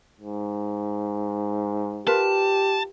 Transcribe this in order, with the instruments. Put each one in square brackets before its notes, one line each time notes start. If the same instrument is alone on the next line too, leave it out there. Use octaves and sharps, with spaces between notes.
[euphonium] G#2
[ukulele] F4 A#4 B4 [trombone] G4 [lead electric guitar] A5